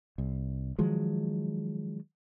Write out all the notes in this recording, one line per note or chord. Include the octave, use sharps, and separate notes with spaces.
C2
D#3 F3 F#3 G#3